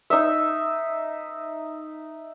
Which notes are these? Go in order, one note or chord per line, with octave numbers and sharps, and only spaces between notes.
D#4 E5